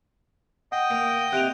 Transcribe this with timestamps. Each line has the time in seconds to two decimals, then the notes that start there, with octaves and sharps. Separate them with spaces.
0.72 D#5 F#5 G5 D#6
0.90 A#3
1.33 C3 F#6 D7 F7